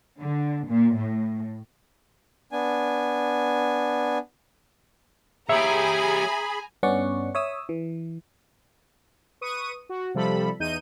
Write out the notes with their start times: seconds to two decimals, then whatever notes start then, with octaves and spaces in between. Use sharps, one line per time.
0.20 D3
0.68 A#2
0.97 A2
2.52 B3 D4 G#5
5.49 G4 G#4 C#5 E5 G#5 A#5 B5
6.83 G2 B3 C#4 D5 F#5 C#6
7.35 C#5 E5 D#6 E6
7.69 E3
9.41 B4 C#6 D#6 D#7
9.89 F#4
10.15 C3 F3 G3 A4 B5
10.59 E2 D#4 G6 D#7